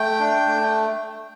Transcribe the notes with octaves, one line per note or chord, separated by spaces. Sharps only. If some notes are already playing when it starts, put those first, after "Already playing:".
Already playing: A3 G5
D4
A3